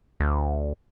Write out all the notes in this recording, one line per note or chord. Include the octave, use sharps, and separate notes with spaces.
D2